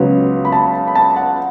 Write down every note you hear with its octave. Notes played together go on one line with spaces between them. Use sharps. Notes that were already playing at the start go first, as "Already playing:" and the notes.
Already playing: C#2 C#3 F#3 B3
B5
A5
B5
A5
F#5